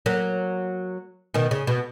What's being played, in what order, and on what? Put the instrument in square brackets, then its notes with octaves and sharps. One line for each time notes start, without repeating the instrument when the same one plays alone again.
[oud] F#3 A#3
B2 D#3
C#3
B2